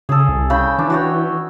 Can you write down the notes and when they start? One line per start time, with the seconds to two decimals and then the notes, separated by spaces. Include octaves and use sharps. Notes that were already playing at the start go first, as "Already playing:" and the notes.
0.09 C#3 G#4 A4
0.29 C2
0.50 C#3 G5 B5
0.79 E3 D4
0.90 F#4 C#5 G5